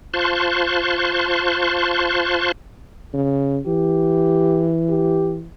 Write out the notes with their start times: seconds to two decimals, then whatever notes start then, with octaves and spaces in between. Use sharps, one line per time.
0.14 F4 C5 A5 C6 C#6 F#6
3.14 C#3
3.67 E3 G4
4.89 G4